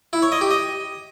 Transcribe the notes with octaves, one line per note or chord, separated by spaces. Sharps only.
E4
C#5
D#5
G4
D#5